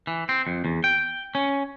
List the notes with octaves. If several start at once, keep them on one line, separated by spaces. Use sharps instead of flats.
E3
C4
F2
E2
G5
C#4